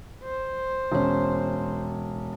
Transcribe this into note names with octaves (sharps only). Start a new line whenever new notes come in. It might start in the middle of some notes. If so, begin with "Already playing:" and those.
C5
E1 C#4